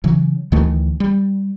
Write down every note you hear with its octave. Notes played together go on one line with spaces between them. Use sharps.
C#3 E3 F#3
D2 D#3 E3 A3
G3